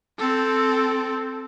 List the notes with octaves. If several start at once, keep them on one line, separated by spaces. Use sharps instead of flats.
C4 A4